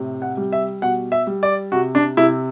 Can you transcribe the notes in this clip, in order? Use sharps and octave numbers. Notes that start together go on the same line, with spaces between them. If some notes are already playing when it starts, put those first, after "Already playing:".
Already playing: A2 C3
F#5
G3
E5
B2 F#5
E5
G3
D5
C3 F#4
D4
C3 E4